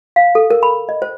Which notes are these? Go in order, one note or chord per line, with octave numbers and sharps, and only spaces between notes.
F5
A4
A#4
B5
D#5
C5